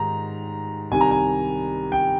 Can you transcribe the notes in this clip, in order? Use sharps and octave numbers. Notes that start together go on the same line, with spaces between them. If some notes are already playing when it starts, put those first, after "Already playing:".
Already playing: G#2 D#3 G3 A#5
C2 C3 D#3 G3 G#5
A#5
G#5
G5